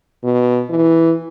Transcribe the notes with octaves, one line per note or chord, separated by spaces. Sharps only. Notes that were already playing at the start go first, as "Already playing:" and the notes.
B2
E3